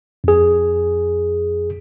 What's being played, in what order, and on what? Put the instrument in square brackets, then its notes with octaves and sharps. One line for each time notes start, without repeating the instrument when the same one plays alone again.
[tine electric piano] F2 G#4